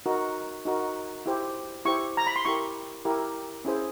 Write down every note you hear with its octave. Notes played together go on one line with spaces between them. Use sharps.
D#4 F#4 A#4
D#4 F#4 A#4
E4 G4 C5
E4 G4 C5 C#6
A#5
B5
C6
E4 G4 A#4 C#6
E4 G4 A#4
C#4 E4 G#4 C5